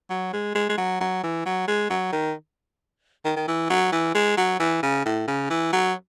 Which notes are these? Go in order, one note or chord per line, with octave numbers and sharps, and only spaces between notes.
F#3
G#3
G#3
G#3
F#3
F#3
E3
F#3
G#3
F#3
D#3
D#3
D#3
E3
F#3
E3
G#3
F#3
E3
C#3
A2
C#3
E3
F#3